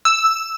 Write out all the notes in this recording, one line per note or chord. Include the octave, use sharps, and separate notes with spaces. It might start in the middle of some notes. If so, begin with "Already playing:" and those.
E6